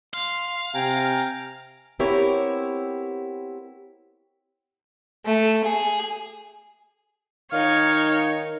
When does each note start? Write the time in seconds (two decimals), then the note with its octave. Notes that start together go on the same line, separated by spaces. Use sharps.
0.14 F5 C6
0.75 C3 G5 G#5 A#5
1.99 B3 C4 E4 G4 A#4 C#5
5.25 A3
5.64 G#4
7.52 D#3 D#4 C#5 F5